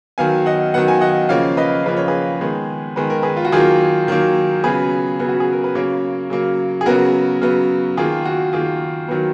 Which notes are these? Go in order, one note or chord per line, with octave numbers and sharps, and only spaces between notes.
D#3 F#3 B3 F5 G#5
D#5 F#5
D#3 F#3 B3 F#5
G#5
D#5 F#5
C#3 F3 A#3 C#5 F5
B4 D#5
C#3 F3 A#3 B4
C#5
G#4 B4
D#3 G#3 B3
D#3 G#3 B3 B4
A#4
G#4 B4
F4
F#4
D#3 F#3 A#3 F4 G#4
D#3 F#3 A#3
C#3 F#3 B3 G#4 B4
C#3 F#3 B3
F#4
G#4
A#4
B4
C#3 F#3 A#3 A#4 C#5
C#3 F#3 A#3
G#4
C#3 F#3 B3 F#4 A#4
C#3 F#3 B3
D#3 A#3 F4 G#4
F#4
D#3 A#3 F4 G#4
D#3 F#3 B3